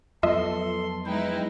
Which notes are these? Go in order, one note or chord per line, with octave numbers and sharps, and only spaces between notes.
F2 F#3 B3 F4 A4 D#5 E5 C6
G#3 D#4 E4 B4 G5